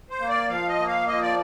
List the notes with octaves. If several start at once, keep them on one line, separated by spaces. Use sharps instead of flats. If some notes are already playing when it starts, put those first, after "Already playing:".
C5
A#3
D5
F3 F5
D#5
A#3
F5
F3 D#5
D5